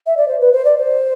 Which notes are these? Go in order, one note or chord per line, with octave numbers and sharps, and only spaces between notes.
E5
D5
C5
B4
C5
D5
C5